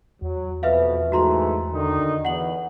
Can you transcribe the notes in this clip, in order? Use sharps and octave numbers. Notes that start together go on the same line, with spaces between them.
E2 F#3
F2 B2 B4 E5 F5
G#2 E3 A3 F#4 A#5 C6
D3 D#3 D#4
E2 F#5 F#7